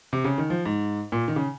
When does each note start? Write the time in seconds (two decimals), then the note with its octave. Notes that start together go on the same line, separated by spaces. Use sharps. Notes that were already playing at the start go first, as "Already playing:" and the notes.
0.13 C3
0.24 C#3
0.38 D#3
0.50 F3
0.66 G#2
1.12 A#2
1.28 D#3
1.36 C#3